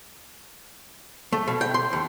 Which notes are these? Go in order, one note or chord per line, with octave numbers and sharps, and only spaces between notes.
A3
B2
G5
C6
D#2